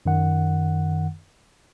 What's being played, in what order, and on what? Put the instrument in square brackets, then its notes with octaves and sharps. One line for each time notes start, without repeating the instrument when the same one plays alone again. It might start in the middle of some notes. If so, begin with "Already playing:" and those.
[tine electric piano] F#2 D#3 F#5